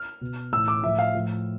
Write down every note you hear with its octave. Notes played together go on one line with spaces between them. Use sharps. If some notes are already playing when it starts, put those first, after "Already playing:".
Already playing: F6
B2
A2 E3 E6
D6
A2 F3 E5
F5
A2 F3